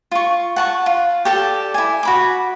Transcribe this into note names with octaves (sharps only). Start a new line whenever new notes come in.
F4 C#6
F#5 A5 C#6
F4
G4 A4 D5 A5
E4 G#5
F#4 B5 D6